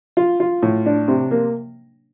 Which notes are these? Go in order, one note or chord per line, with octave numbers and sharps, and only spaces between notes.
F4
F4
A2
D4
C3
A#3